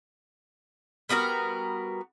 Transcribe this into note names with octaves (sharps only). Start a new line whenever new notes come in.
G3 B3 F#4 A#4